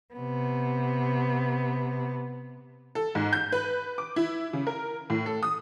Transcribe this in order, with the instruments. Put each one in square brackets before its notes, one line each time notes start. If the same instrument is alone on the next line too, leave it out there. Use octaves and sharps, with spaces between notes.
[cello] C3 B3
[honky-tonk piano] A4
G#2
G6
B4
D6
E4
C#3
A#4
A2
A4
D#6